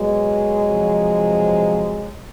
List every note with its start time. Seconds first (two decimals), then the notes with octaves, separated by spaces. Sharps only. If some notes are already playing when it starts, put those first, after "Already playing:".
Already playing: B2 F#3 G#3
0.65 C3 F3